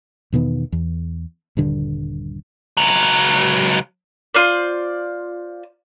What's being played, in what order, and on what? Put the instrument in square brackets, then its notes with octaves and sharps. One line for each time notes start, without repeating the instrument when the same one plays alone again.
[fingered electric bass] E2 B2 D#3 B3
E2
D#1 G2 D3
[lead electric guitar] C#2 F#3
[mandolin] F4 C5 D5